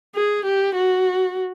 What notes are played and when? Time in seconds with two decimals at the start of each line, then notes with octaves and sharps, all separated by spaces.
0.15 G#4
0.45 G4
0.75 F#4